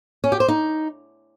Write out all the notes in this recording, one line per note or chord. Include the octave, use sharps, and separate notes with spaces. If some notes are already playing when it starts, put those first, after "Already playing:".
C#4
G4
C5
D#4